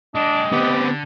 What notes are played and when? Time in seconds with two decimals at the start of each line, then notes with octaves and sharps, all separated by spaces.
0.15 G#3 D4 G4 D#5
0.52 D3 B3 C4 G4